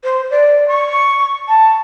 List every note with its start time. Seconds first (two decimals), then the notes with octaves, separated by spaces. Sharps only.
0.04 C5
0.31 D5
0.68 C#6
1.48 A5